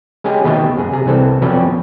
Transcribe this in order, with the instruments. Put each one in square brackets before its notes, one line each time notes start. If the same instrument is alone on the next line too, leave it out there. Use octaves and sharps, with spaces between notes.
[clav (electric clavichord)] G#3 C#4 G4 G#4
D#2 B2 D#3 G4 D#5 E5
F#2 G#4
C3 G#4
C2 E3 C4 A4
F2 B2 F#3 C#4 D5 G5